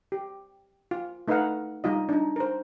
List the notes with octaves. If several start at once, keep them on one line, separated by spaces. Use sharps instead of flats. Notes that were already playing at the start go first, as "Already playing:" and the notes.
G4
F4
A3 D#4 B4 D#5 F5 F#5
G3 D#4 F4 D#5
D4 D#4
A#4 C5